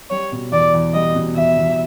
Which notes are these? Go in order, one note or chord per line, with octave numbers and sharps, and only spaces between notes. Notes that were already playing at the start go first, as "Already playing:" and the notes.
G3 C#5
B2
E2 D5
E2
G3 D#5
B2
E2 E5
E2